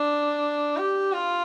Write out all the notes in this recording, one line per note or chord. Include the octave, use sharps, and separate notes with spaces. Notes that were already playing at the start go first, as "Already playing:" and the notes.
Already playing: D4
G4
F4